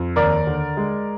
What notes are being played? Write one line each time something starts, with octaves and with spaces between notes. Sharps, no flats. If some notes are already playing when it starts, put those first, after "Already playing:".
Already playing: F2
D#2 A#4 D5
D3
G#3